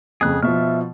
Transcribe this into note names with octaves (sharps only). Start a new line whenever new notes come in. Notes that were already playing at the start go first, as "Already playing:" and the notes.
F2 C#3 G#4 F#6
B2 F3 E5 F6